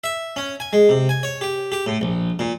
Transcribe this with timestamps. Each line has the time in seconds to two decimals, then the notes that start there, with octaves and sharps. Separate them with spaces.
0.04 E5
0.36 C#4
0.60 G#5
0.73 G#3
0.89 C3
1.09 G#5
1.23 C#5
1.41 G4
1.72 G4
1.86 A2
2.01 A#1
2.39 A#2